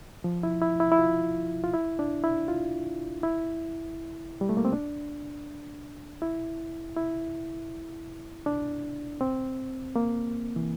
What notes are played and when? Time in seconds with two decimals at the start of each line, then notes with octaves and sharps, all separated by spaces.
0.24 F3
0.43 E4
0.62 E4
0.80 E4
0.92 E4
0.99 F4
1.64 F4
1.74 E4
1.99 D4
2.24 E4
2.48 F4
3.23 E4
4.41 G3
4.49 A3
4.57 A#3
4.65 C4
4.73 D4
6.22 E4
6.96 E4
8.46 D4
9.21 C4
9.96 A#3
10.56 E3